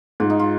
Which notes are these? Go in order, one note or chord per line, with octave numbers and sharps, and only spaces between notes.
G#2 F4
D#4
F4